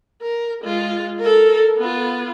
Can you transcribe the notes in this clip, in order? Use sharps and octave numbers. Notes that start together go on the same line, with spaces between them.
A#4
G#3 F4
A4 A#4
B3 F4